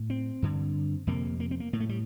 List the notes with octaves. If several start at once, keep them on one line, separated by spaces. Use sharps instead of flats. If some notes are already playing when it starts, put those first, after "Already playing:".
Already playing: A2
C4
G2 D3
F2 C3 A#3
A#3
C4
A#3
A2 A#3
A3
G3